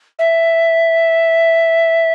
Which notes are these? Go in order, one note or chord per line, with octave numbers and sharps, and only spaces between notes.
E5